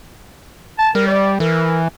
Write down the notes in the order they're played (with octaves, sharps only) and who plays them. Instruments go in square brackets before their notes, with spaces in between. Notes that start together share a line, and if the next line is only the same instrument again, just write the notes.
[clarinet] A5
[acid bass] G3 [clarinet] A#4
[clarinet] D5
[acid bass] E3 [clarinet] A#4